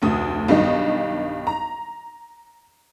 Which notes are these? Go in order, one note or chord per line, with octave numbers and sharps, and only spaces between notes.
F1 D2 D#6
B1 G2 D#3 D#4 D#5
A#5